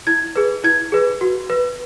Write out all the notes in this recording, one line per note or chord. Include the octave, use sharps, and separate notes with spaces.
E4 G#6
G#4 B4
E4 G#6
G#4 B4
F#4
B4